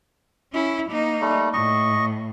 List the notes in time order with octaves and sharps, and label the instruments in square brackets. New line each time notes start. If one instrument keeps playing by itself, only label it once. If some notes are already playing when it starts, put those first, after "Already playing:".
[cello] C#4 E4
A#3 D#4
[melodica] G3 A3
[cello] A2 [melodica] D#5 C#6